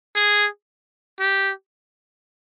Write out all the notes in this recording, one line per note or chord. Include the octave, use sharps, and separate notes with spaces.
G#4
G4